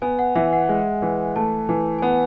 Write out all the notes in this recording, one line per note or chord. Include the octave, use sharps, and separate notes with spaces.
B3 G#5
F#5
E3 E5
F#5
G#3
E3
A3 A5
E3
G#5
B3 F#5